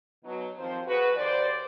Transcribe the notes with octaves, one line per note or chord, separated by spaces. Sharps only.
B2 F#3 D#4
D#2 F3 C4 C5
F#4 G#4 B4
D#2 C5 D5